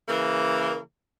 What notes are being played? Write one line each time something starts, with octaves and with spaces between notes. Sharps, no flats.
C#3 E3 A#3